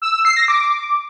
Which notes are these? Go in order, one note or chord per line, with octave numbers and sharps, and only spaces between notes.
E6
E6
C7
A#6
D6